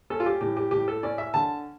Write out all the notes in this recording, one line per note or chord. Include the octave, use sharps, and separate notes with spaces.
C#4 A4
F4
G4
A2 G4
G4
A2 G4
A4
C#4 D5
E5
D3 A5